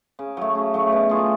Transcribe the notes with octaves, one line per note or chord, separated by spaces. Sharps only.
C#3
F#3 A3
C#3
F#3 A3
B2
A3 F4 G#4